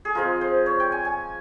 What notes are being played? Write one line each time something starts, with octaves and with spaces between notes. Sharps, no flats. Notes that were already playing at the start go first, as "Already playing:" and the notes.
G#4
F3 G#3 C4 F4 A#4
C5
C#5
G5
G#5
G#5